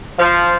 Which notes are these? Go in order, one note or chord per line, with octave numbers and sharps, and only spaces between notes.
F3